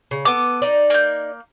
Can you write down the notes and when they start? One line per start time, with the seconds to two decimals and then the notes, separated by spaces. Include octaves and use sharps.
0.11 C#3
0.25 B3 A4 D6
0.62 D#4 D5
0.90 A#3 G6